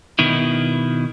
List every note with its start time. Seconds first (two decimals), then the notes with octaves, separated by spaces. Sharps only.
0.19 B2 D#3 E4